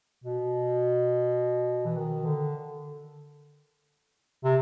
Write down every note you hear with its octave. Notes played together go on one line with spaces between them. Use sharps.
B2
E3
D#3
D3
C3